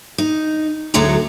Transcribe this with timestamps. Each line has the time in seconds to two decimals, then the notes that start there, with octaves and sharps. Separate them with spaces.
0.18 D#4
0.94 D2 A2 F#3 G#3 A3 A#5